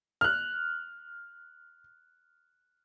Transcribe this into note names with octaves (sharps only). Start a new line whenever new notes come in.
F6 F#6